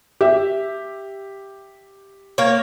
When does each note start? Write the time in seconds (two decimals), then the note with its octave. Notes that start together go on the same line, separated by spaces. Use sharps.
0.21 G4 E5
2.38 A#3 C#5